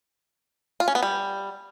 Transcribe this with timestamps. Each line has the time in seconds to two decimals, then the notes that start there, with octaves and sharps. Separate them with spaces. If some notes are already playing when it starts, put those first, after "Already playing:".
0.80 F4
0.88 C#4
0.95 B3
1.03 G3